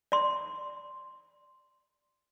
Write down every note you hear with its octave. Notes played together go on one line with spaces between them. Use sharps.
D5 C6